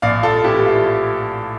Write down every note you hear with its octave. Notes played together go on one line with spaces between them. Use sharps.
A#1 D5 F5
F4 A4
A2 E3 E4 G4
F4